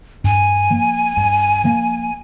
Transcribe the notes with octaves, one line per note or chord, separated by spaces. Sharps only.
G2 G#5
F3 A#3
G2
F3 A#3